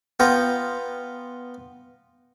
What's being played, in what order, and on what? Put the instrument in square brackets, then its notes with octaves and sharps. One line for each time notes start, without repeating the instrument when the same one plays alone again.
[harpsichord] B3 F4 G5 A#5